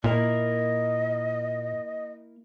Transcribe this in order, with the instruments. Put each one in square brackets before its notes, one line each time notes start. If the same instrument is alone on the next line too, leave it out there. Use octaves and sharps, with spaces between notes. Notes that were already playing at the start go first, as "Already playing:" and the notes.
[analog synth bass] A#2 [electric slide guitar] A#3 E4 A#4 [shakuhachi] D#5